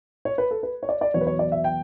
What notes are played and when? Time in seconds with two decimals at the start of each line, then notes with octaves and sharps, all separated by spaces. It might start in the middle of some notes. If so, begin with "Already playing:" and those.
0.25 C#5
0.38 B4
0.51 A4
0.63 B4
0.83 C#5
0.89 D5
1.01 D5
1.14 E2 B2 F#3 B3 C#5
1.21 B4
1.27 C#5
1.39 D5
1.52 E5
1.64 G5